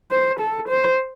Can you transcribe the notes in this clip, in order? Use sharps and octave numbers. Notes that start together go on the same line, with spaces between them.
C5
A4
C5